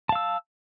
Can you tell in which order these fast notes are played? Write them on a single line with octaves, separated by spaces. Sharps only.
A5 F5 E6